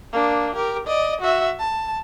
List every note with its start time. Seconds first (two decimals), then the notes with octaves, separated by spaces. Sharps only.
0.13 A#3 D4
0.55 G4 A#4
0.87 D5 D#5
1.21 F#4 E5
1.59 A5